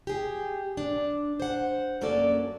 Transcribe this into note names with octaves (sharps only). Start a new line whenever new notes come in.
G4 G#4
D4
C5 F#5
F#2 A#3 C#4 F#4 A4 D5